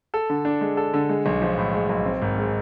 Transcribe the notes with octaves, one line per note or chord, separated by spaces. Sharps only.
A4
D3
D4
G#3
A4
D3
G#3
B1
F3
A2
G#3
B1
C4
G#1
G#3